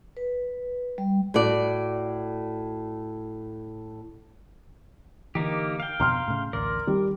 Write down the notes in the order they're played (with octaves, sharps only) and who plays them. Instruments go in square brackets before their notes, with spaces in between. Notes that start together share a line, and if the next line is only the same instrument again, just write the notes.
[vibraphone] B4
G3
[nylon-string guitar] A2 F#4 A4 D5
[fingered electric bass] D3 E3 [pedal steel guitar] A#3 D#4 G4
[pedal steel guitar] F5 G5
[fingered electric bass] F2 B2 D3 [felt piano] A#5 C6 F6
[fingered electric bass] A2 C#3
[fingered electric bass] A1 D2 [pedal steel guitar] A#4 D5
[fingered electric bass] D#3 [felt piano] G3